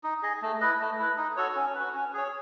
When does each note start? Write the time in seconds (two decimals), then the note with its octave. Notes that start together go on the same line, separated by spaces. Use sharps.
0.04 D#4
0.23 G#4 D#5
0.42 A3
0.61 E4 B4 D#5
0.80 A3
0.99 E4 B4
1.17 D#4
1.37 F#4 A4 C#5
1.56 C#4
1.75 F#4 B4
1.94 C#4
2.14 G#4 C#5